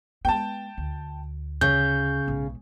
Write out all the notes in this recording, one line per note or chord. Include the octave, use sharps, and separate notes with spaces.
G#3 B3 G5 A5
D2
C#3 C#5 G6
B1 G#2